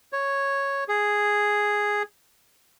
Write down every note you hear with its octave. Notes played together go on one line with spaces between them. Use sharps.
C#5
G#4